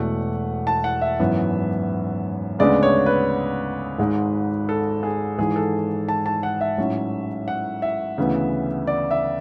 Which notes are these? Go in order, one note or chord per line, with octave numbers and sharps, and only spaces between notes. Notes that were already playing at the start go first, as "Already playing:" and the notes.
Already playing: E1 E2 B2 A3 F#5
A5
F#5
E5
G#1 F#2 E3 B3
D2 C#3 G#3 B3 D4 D5
C#5
B4
G#1 G#2 G#3
A4
G#4
G#1 G#2 E3 G#4
A4
A5
A5
F#5
E5
A1 G#2 F#3 C#4
F#5
E5
D2 C#3 E3 B3
D5
E5